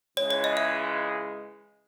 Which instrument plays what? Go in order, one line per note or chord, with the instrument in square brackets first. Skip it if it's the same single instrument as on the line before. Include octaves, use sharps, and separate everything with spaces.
[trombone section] C#2 C#3 E3 G#3 [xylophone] C#5
[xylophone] C#5
D#5
E5